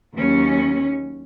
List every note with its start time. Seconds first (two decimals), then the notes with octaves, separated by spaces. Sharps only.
0.16 D#2 F#3 C#4